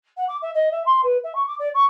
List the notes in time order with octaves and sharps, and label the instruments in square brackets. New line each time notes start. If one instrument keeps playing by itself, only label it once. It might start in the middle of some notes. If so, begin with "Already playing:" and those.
[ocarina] F#5
D6
E5
D#5
E5
C6
B4
E5
C#6
D6
D5
C#6